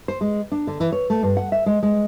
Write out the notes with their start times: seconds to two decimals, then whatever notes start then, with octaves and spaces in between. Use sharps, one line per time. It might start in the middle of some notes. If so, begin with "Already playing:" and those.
0.08 C5
0.21 G#3
0.52 D4
0.67 D3
0.80 E3
0.92 C#5
1.10 A3
1.23 G2
1.37 F#5
1.52 E5
1.66 G#3
1.83 G#3